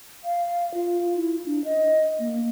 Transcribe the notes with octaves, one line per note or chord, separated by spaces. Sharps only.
F5
F4
E4
D4
D#5
A#3